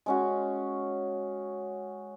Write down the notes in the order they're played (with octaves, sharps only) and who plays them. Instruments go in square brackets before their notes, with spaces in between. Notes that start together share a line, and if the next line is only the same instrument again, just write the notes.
[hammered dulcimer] G#3 C#4 F#4